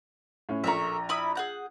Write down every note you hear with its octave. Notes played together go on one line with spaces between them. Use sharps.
A2 C#4
A#1 A3 A#4 E5 A#5
E4 B5 D#6
G#4 F#5 G6